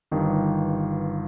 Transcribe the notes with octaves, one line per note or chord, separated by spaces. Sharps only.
G1 G2 D#3